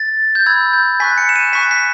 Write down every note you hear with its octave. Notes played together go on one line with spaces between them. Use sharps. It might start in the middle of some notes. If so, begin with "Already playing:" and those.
Already playing: A6
G6
B5 E6 G6 G#6
G6
G#5 C#6 F#6 B6
C#7
E7
D#7
G#5 C#6 F#6 B6
B6